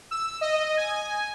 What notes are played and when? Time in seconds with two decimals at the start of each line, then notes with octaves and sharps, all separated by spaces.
0.11 E6
0.41 D#5
0.77 G#5